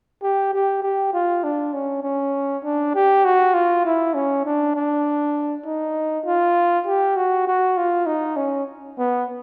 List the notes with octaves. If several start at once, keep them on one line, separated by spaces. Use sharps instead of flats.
G4
G4
G4
F4
D4
C#4
C#4
D4
G4
F#4
F4
E4
C#4
D4
D4
D#4
F4
G4
F#4
F#4
F4
D#4
C#4
B3